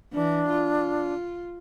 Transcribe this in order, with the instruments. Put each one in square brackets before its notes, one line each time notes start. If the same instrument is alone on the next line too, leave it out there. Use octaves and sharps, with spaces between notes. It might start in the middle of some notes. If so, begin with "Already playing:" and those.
[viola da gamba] E3 [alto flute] D4
[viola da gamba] F4